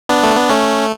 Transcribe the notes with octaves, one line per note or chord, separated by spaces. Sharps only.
B3 D4
A3
B3
A3 C#4